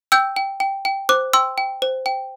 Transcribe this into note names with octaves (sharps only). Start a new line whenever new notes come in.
G5 E6 G6
G5
G5
G5
C5 D6 F#6
G5 C6 E6
G5
C5
G5